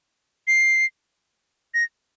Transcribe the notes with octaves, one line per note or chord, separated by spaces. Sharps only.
C7
A#6